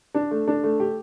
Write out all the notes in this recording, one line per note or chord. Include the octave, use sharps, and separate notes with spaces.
D4
A3
D4
A3
G4